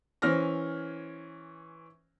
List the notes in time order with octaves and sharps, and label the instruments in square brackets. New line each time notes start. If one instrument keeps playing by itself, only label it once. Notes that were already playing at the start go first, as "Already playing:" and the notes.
[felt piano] E3 C#4 C5 F6 A#6